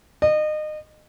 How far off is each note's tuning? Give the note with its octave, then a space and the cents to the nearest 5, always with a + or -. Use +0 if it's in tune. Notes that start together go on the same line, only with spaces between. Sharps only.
D#5 -30